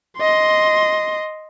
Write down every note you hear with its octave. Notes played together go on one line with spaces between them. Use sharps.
D#5 C6